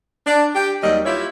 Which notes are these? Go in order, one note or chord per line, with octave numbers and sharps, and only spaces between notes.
D4
G4
D#2 D#3 F#3 G3 D#5
E4 F4 G4 C#5 E5